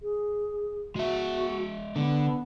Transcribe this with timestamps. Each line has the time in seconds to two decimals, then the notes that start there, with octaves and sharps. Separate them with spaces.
0.02 G#4
0.96 G#3 F#4 E5
1.96 D3 B3